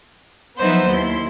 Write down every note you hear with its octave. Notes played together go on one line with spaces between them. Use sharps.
F3 F#3 B3 D#4 C5 E5
D#2 E4 C6